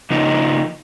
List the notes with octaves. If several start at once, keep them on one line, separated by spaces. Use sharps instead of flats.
C#3 F3 A#3 D#4